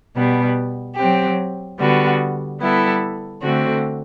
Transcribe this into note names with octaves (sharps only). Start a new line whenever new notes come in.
B2 G3 B3
F#3 C4 G4
D3 G3 B3 F#4
G3 B3 E4 A4
D3 A3 C4 F#4